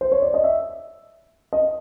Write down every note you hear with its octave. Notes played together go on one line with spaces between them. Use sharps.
C5
C#5
D5
D#5
E5
D#5